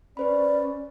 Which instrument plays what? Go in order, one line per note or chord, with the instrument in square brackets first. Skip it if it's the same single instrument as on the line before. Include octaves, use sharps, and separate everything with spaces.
[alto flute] C#4 [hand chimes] B4 C5 B5 [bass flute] D5